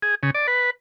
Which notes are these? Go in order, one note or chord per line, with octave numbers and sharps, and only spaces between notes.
G#4
C#3
D5
B4